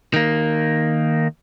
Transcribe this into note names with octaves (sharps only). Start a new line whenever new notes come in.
D#3 A#3